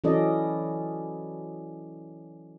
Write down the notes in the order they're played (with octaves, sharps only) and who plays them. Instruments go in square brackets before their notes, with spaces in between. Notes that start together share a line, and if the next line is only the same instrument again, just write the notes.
[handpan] E3 F#3 C#4 A4 D5 D#5